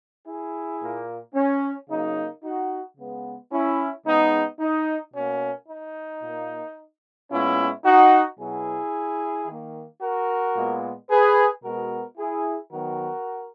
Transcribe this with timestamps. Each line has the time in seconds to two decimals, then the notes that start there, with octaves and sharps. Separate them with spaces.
0.27 E4 G#4
0.81 A#2 A#3
1.35 C#4
1.89 C#3 F#3 A#3 D#4
2.44 D#4 F#4
2.98 C#3 G#3 B3
3.52 C#4 E4
4.06 C#3 G#3 B3 D#4
4.60 D#4
5.14 B2 A#3 C#4
5.68 D#4
6.23 A#2 A#3
7.31 A#2 G#3 B3 C#4 E4
7.85 D#4 F#4
8.39 B2 F#3 B3 E4 G#4
9.47 D#3 A#3
10.02 F#4 A#4
10.56 A#2 G#3 B3
11.10 G#4 B4
11.64 B2 G#3 B3 F#4 A#4
12.18 E4 G#4
12.72 D#3 F#3 B3 F#4 A#4